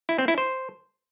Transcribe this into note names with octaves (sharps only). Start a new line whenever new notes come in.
E4
C4
E4
C5